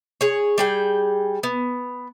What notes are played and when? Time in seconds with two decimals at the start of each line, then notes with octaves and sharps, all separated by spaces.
0.21 G#4 C#5
0.58 G3 G#4 G5
1.43 B3